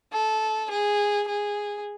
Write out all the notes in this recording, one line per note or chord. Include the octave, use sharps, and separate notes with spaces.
A4
G#4
G#4